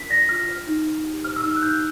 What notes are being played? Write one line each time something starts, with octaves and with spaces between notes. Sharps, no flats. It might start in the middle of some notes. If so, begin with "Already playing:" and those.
Already playing: D4 F4 A#4 B6
D5 A#6
F4 F6
C5
D#4
D#4
G4
C5 F6
E6
D#4 F6
F#6
D#4 G6